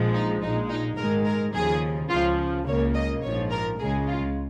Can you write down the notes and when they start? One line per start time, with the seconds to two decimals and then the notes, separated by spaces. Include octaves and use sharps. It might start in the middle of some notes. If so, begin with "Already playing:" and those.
Already playing: A#1 A#2 F3 G#3
0.14 D#4
0.42 A#1 A#2 G#3 D#4
0.69 D#4
0.97 G#2 D#3 G#3 A#4
1.25 A#4
1.54 D#2 C#3 F3 G#4
2.10 C#2 C#3 F3 F4
2.66 C#2 C#3 A#3 C#5
2.94 D#5
3.23 A#1 G#2 F3 C#5
3.51 A#4
3.79 C#2 C#3 G#3 G#4
4.07 F4